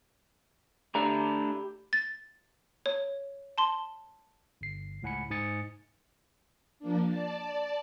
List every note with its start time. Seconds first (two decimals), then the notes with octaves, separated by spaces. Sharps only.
0.95 A3 D4 E4 G4 A#5
1.93 A6
2.86 C#5
3.58 A5 C6
4.61 G1 C7
5.03 C#2 A2 F#5 G#5 B5 C#7
5.30 G#2 D#4 G#5 D#6 A6 C#7
6.79 F3 A#3 D4
7.09 D5 A5